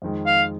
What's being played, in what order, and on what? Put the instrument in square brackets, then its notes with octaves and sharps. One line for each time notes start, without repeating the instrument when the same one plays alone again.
[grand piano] F2 D#3 G#3
[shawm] F5